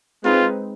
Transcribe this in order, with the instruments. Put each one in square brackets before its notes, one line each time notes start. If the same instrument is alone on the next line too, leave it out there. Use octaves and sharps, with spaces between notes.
[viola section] G#3 C4 D#4 B4 [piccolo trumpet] F4